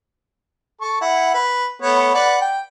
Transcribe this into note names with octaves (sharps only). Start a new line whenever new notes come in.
A4 C#6
E4 F#5
B4
A3 B3 C#5
B4 D5 F#5
G5